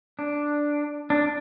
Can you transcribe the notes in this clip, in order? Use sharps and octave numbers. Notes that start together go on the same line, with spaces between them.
D4
D4